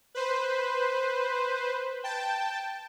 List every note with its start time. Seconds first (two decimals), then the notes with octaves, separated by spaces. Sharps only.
0.15 B4 C5
2.04 G5 A5